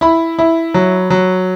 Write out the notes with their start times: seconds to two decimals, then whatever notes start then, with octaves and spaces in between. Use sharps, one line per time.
0.01 E4 B5
0.39 E4
0.74 F#3
1.10 F#3